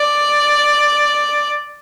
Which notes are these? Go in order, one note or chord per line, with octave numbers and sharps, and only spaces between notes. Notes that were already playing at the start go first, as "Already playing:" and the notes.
Already playing: D5